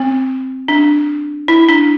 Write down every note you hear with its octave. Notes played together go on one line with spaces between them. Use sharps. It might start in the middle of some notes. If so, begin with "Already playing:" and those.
Already playing: C4
D4
E4
D4